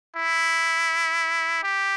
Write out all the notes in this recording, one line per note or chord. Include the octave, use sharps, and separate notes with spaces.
E4
G4